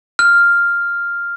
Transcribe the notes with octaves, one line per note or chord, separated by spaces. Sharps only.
F6